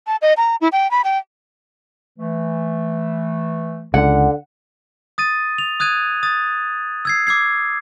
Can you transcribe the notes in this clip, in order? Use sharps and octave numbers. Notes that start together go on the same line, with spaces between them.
A5
D#5
A#5
E4
G5
B5
G5
E3 A3
C#2 D3 F#5
D#6 A6 D#7
F7
D#6 F#6 G#6 D#7
D#6 A6
E6 G#6 C7
D6 E6 G#6 C7